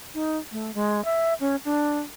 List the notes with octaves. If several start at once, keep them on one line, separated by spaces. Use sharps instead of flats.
D#4
A3
G#3
E5
C#4
D4